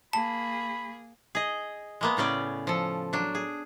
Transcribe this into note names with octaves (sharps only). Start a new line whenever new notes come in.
A#3 G#4 A5 B5
G#4 D#5
G#3 A#3 B3
A2 C#3 C#4 D5
F3 A4
F#3 D4
G#4